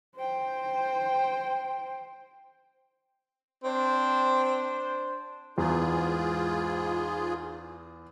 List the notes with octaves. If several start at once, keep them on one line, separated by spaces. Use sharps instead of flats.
C5 G5
C4 D4 C5
E2 G#2 F4 G#4